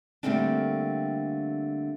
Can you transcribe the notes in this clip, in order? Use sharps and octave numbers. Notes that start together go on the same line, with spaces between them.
D3 G3 A3 A#3 C4 D4